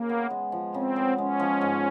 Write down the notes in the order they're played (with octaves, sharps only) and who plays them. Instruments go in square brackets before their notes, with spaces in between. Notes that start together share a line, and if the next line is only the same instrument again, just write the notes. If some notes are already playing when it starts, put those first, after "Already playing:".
Already playing: [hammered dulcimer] C#3 [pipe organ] A#3
[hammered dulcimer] B3
G#3
F3
[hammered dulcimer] C#3 [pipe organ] C4
[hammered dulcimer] B3
[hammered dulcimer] G#3 [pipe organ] C#4
[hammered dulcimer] F3
G#2